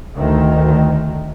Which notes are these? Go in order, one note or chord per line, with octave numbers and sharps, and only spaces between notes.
D2 D#3